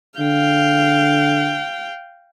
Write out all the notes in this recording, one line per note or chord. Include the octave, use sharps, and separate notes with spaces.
D3 F5 G5